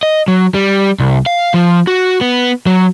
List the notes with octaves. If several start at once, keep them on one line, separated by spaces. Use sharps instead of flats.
D#5
F#3
G3
C2
F5
F3
F#4
B3
F#3